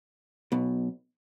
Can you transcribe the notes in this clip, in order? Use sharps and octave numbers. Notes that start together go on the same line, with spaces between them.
B1 B2